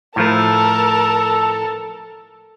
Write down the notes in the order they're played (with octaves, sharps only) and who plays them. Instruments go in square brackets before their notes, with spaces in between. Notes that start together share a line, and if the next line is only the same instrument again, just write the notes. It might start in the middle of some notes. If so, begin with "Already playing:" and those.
[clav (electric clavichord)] A2 F3 A3 [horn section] A4 [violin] A#4 A5